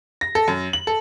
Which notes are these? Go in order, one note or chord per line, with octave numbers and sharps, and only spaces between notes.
A#6
A4
F#2
F#7
A4